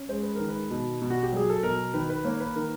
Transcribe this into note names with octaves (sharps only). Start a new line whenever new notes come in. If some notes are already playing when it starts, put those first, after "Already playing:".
Already playing: C#4
G#3 C5
B4
D#3 A#4
B4
B2
B2
F#4
G4
F#3 G#4
A4
B2 A#4
D#3 B4
B4
A#3 C#5
B4
D#3 A#4